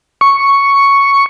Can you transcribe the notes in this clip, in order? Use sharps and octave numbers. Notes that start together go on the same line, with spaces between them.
C#6